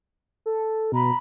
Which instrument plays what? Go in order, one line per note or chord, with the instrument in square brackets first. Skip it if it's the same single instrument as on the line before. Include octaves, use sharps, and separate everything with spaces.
[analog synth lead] A4
[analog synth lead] B2 [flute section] A#5 B5